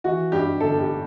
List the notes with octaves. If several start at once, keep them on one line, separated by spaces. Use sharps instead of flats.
E3 F#4
G2 G4
G1 A4
G4